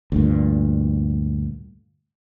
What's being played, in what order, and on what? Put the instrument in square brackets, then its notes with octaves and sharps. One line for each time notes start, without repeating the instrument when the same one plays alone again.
[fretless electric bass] D2 G2 A#2